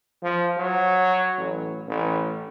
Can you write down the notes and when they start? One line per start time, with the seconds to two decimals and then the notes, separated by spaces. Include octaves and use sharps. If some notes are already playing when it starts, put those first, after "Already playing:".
0.24 F3
0.58 F#3
1.39 A1
1.88 A1